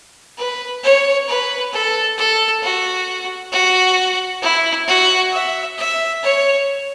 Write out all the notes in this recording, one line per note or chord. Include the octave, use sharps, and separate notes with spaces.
B4
C#5
B4
A4
A4
F#4
F#4
E4
F#4
E5
E5
C#5